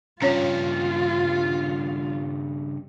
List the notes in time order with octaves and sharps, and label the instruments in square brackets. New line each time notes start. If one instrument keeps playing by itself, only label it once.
[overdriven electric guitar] G2 C#3 [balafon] C#4 C#5 [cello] F4